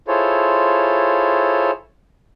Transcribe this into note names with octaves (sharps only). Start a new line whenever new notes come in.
E4 F4 G#4 A4 C5 C#5